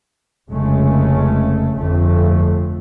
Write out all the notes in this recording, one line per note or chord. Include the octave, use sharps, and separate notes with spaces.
F1 C#3 G#3 A3 C#4
G1 F2 A3